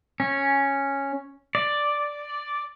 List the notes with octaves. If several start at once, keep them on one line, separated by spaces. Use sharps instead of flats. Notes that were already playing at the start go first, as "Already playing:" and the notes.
C#4
D5